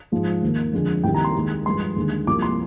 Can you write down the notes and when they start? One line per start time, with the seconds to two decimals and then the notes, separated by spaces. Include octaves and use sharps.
0.12 G#2 F3 G#3
0.43 D#2 D#3 A#3
0.73 F2 D3 G#3
1.04 C2 C3 D#3 G5
1.15 A#5
1.25 C6
1.36 D#2 D#3 G#3
1.66 G2 F3 G#3 C6
1.96 D#2 D3 G#3
2.27 C2 C3 F3 A#3 D6
2.42 C6